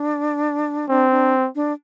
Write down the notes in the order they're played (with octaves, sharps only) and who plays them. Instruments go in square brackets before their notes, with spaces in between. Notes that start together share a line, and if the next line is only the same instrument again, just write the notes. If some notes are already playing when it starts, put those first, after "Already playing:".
Already playing: [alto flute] D4
[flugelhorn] C4 [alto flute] D4
[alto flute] D4
D4